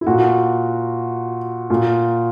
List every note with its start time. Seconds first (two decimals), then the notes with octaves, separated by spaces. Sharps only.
0.01 E4
0.06 A#2 F#4
1.70 A#2